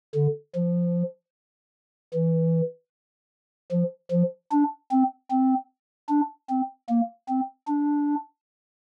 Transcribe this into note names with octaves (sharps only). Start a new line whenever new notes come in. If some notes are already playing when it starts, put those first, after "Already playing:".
D3
F3
E3
F3
F3
D4
C4
C4
D4
C4
A#3
C4
D4